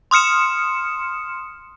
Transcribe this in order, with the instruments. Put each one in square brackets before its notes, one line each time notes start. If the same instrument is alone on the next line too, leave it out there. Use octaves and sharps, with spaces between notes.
[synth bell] C6 D#6 F6 C#7 E7